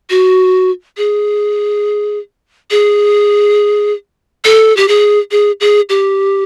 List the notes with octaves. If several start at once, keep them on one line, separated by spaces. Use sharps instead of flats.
F#4
G#4
G#4
A4
G4
G#4
G#4
G#4
G4